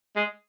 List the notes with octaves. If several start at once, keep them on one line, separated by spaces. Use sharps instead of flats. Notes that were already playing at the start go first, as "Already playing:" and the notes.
G#3